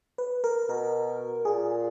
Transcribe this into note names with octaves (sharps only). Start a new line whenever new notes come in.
B4
A#4
B2 A#4
A#2 G#4